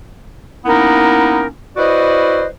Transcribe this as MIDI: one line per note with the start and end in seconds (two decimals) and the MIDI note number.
0.66 1.46 58
0.66 1.46 59
0.66 1.46 61
0.66 1.46 63
0.66 1.46 64
0.66 1.46 70
1.77 2.45 64
1.77 2.45 66
1.77 2.45 71
1.77 2.45 72
1.77 2.45 74
1.77 2.45 75